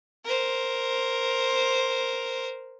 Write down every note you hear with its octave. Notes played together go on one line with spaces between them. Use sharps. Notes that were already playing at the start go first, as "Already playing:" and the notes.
A#4 C5